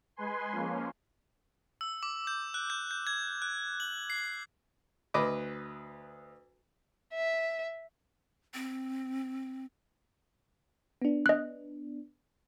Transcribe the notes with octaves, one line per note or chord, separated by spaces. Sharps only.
G#3 B4 G#5 C6
F3 A#3 C#4
E6
D6
G6
F#6
G6
G6
G#6
F#6
F#7
C7
D2 B4 D#5 D6
E5
C4
B3 D4
D#5 F#6